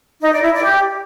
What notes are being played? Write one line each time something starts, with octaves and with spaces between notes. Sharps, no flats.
D#4
D5
E4
D5
G4